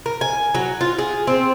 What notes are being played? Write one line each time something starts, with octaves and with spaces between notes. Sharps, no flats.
A#4
G#5
F#3
F4
G#4
C4